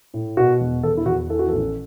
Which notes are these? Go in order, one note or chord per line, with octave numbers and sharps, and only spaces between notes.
A2
B2 F#4
E1
E2 A4
E4
E2 F#4
E3 A4
F#4
A1 A4